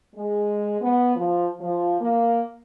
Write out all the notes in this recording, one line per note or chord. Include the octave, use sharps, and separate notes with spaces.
G#3
B3
F3
F3
A#3